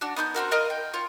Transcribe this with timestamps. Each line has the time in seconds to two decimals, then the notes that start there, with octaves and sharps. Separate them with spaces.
0.01 D4 F#4
0.16 B3 D#4 C6 G6
0.34 C4 E4 F#4 A#4
0.51 A#4 D#5 F5
0.70 G5
0.94 F4 C#5